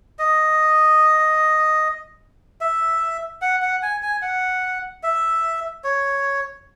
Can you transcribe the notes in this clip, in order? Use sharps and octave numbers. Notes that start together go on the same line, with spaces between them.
D#5
E5
F#5
F#5
G#5
G#5
F#5
E5
C#5